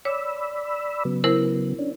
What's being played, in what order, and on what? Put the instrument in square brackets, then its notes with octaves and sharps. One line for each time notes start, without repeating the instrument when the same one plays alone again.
[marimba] C#5 [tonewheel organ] D5 B5 E6
[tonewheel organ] C#3 F#3 B3
[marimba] E4 A#4 C5
[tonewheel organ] C#4 D4